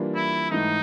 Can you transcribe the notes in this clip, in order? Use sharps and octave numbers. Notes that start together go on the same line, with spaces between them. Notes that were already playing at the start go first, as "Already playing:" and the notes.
Already playing: E3 G3 A#3 D4 F4
E4
G#2 E3 A3 D#4